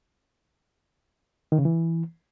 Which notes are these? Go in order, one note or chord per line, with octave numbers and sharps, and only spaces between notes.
D#3
C#3
E3